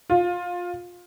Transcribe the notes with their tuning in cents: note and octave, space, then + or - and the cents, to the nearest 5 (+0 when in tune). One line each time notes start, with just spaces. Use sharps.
F4 +20